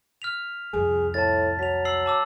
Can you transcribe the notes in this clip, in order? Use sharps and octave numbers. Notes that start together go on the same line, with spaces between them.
F6 B6 F7
C2 F2 G#4
A2 A5 A6
F#3 B6 F7
E6 C7 F#7
A5 D6 E6